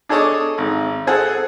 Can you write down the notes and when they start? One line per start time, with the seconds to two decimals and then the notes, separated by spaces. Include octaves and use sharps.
0.09 D4 G#4 A4 C#5 D#5 D6
0.58 G#1
1.07 C4 G#4 A4 F#5